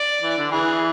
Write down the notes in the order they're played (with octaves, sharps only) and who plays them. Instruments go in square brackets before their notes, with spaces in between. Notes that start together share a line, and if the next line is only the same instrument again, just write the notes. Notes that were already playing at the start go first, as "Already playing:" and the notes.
Already playing: [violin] D5
[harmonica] E3
D3
[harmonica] E3 [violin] G#4